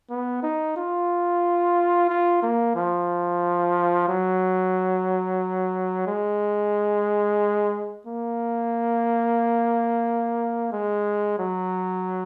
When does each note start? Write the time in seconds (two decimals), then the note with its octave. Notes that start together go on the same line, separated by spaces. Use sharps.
0.10 B3
0.43 D#4
0.77 F4
2.10 F4
2.43 A#3
2.75 F3
4.08 F#3
6.07 G#3
8.07 A#3
10.72 G#3
11.39 F#3